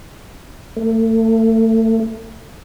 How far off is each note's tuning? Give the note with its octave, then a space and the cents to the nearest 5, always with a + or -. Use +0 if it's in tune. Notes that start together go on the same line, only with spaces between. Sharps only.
A3 +30